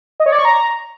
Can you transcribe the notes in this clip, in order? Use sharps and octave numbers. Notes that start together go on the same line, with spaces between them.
D#5
C#5
D5
C#6
A#5